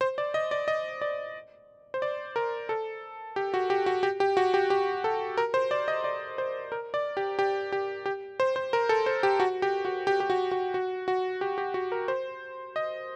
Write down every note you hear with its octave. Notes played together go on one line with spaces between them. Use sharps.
C5
D5
D#5
D5
D#5
D5
C5
D5
A#4
A4
G4
F#4
G4
F#4
G4
G4
F#4
G4
G4
A4
A#4
C5
D5
D#5
D5
C5
A#4
D5
G4
G4
G4
G4
C5
C5
A#4
A4
C5
G4
F#4
G4
F#4
G4
G4
F#4
F#4
F#4
F#4
G4
G4
F#4
A#4
C5
D#5